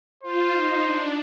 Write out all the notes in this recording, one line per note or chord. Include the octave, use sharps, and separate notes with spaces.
F4 C5
D#4
D4